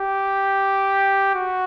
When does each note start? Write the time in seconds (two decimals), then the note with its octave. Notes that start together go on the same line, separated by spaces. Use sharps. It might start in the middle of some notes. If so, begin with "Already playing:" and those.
Already playing: G4
1.35 F#4